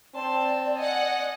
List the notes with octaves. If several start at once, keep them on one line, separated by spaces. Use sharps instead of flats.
C4 D5 A5 C6
D#5 F#5 G#5